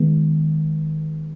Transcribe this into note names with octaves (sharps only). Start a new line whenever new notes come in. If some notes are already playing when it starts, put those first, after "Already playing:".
Already playing: D#3 G#3 B3